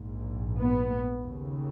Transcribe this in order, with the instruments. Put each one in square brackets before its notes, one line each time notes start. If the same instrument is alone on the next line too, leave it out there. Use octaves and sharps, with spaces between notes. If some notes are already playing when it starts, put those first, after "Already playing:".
Already playing: [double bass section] A#1 G#2
B3
D#2 C#3